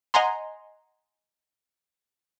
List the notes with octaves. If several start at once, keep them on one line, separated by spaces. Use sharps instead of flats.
D#5 F#5 G#5 A#5 C6